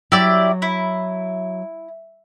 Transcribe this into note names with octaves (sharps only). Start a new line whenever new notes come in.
F#3 E4 G4 D5
E4